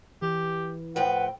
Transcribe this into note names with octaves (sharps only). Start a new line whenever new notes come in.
E3 G4
A2 F3 B4 F#5 G5